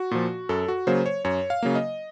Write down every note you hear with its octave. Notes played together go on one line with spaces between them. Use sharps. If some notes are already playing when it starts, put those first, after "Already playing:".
Already playing: F#4
A#2 F3
F#2 A4
F#4
C#3 F#3 A#3 C5
C#5
F#2 C#5
F5
C#3 F#3 A#3
D#5